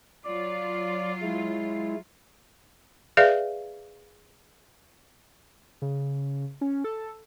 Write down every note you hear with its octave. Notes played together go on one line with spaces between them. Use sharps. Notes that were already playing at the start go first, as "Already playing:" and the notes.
F#3 F4 D5
G#3 E4
G#4 B4 D5 E5 F5
C#3
C#4
A4